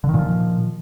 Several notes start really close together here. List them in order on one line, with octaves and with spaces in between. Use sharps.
D3 D#3 A#2 F3